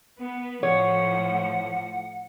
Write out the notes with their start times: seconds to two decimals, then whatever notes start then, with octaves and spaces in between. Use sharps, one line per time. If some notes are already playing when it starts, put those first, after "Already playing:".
0.20 B3
0.63 A2 F3 C#5 F#5